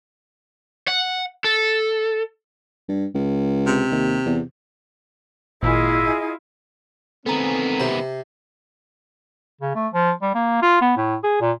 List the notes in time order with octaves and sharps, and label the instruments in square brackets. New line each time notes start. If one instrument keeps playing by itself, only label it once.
[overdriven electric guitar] F#5
A4
[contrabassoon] G2
C#2
[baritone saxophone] C3
[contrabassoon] D#2
E2
[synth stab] G#1 A#2 [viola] E4 F4 [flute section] G#4 D#5 [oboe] E5
[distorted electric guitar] D#3 B3 [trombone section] C4 [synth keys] A4 G#5 A#5
[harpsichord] C3 C5
[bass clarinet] C#3
A3
F3
G3
A#3
F4
B3
A2
G#4
A#2